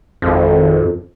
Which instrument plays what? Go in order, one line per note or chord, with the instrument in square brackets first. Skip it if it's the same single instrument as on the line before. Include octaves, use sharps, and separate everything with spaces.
[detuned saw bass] G#1 [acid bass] F2